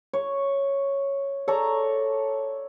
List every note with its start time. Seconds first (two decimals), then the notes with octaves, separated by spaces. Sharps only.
0.13 C#5
1.48 A4 C#5 D5 A#5